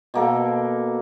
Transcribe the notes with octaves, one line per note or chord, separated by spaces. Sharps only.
B2 A#3 A4